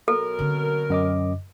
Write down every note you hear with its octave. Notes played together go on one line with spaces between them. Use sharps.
B2 F#3 A4 A#4
D3 C4
F#2 D#5 D6